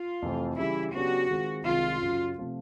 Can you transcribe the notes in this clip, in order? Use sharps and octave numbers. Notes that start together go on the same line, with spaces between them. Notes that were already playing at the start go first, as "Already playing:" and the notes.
Already playing: F4
F2 C3 E3 A3 C4
C#3 E3 G3 E4
C#3 F#3 B3 D4 F#4 G4
D#3 G#3 C4 F4
C2 C3 D#3 G#3 F4
F#2 C#3 F#3
C3 F3 A3